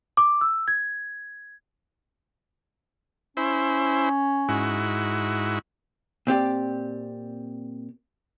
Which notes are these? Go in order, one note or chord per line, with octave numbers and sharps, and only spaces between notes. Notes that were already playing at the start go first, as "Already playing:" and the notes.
D6
E6
G#6
C#4 E4 C5
G#2 E4 F#4
A#2 C4 G4 D5